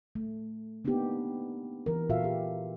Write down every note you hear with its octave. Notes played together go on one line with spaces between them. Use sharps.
A3
A#3 B3 D4 D#4 G4
E3 A#4
A#2 F4 F#4 A4 E5 F5
G4